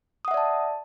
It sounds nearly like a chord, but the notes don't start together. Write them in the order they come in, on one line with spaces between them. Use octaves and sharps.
D#6 F#5 E5 D5 A5